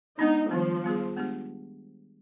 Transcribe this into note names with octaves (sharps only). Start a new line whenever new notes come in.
G#3 B3 D4 D#4
D#3 F3 G3 B3
G3 B3 F4 G#4
G#3 B3 D4 G4